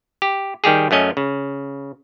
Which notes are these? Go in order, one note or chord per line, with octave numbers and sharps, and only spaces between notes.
G4
D#3 G3 G4 G#4
F#2 A3 C#4 D#5
C#3